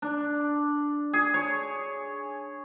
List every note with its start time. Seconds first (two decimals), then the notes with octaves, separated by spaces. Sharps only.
0.02 D4
1.13 G#4
1.34 C#5